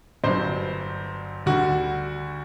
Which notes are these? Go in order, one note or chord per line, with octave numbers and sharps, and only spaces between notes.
G1 G2 F#3 C5
D2 D3 G3 F#4